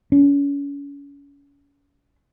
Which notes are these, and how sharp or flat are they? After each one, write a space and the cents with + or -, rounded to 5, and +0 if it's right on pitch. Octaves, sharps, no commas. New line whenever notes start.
C#4 +35